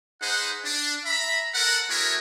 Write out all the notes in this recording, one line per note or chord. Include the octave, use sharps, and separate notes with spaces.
D#4 G#4 B4 C5 F#5
D4
E5 A#5 B5
A4 A#4 C5 F#5
A3 E4 F#4 G#4 A#4 C#5